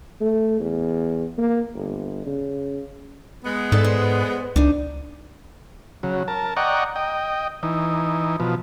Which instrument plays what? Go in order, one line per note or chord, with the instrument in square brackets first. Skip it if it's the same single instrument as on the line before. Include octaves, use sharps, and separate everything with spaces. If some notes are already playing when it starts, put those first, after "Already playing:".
[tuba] A3
E2
A#3
G1
C#3
[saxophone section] G#3 B3
[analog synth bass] G#2 [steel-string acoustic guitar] A4 D5 E5
[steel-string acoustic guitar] C5
[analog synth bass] C#2 [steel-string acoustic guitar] D4 D#4
[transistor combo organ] C#3 F#3
A#4 A5
D5 D#5 F#5 G5 A#5 C#6
D#5 G5
E3 D#4
B2 F3